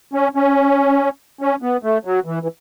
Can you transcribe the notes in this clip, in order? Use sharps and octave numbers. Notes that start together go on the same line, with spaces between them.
C#4
C#4
C#4
B3
A3
F#3
E3
E3